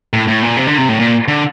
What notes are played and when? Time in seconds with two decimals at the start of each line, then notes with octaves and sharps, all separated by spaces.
0.13 A2
0.28 A2
0.42 A#2
0.57 C3
0.67 D3
0.78 C3
0.89 A2
1.00 A#2
1.28 D3